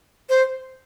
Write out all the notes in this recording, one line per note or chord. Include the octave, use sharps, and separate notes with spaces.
C5